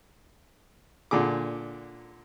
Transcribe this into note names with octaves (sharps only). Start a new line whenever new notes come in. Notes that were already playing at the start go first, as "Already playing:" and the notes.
A#2 D3 G#4 D6